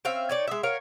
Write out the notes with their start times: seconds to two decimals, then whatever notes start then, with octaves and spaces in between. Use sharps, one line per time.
0.05 C4 C#4 E5 F5
0.29 D#4 C#5 D5
0.47 G#3 E5
0.63 A#4 C#5 F5